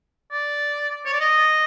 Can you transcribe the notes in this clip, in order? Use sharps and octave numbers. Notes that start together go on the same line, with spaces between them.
D5
C#5
D5
D#5